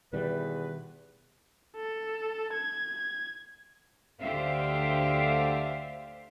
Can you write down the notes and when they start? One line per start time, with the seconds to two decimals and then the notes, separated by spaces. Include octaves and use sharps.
0.13 E2 B2 D#3 G3 B4
1.76 A4
2.53 G#6
4.21 D2 D3 G4 C5 E5 F5